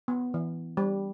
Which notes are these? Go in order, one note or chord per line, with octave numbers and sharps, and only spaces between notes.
B3
E3
G3